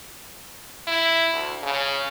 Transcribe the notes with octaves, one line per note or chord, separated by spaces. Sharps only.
E4
D2
C#3